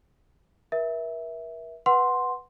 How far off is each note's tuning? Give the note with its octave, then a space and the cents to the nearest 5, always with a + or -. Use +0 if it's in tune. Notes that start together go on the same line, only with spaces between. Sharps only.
A#4 +45 E5 -10
B4 +0 F#5 +0 C6 +0